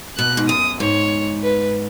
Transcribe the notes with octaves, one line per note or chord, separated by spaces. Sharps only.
B2 F#6
G#2
F#2 D#6
G#2 C#5
B4